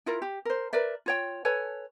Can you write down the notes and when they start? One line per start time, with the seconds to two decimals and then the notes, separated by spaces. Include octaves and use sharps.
0.06 E4 F4 A#4
0.22 G4
0.45 A#4 C5
0.73 A#4 B4 D5 E5
1.06 F4 C#5 G5
1.45 A4 B4 C#5 G#5